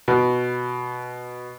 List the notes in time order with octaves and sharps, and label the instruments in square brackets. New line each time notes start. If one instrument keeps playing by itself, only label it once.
[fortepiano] B2